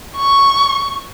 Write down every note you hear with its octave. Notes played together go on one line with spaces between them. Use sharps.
C#6